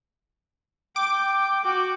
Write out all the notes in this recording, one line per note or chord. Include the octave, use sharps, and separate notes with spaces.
G5 D6
F#4 G5